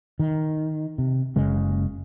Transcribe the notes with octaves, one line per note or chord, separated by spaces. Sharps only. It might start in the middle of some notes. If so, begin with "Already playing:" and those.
D#3
C3
F#1 C#3 G#3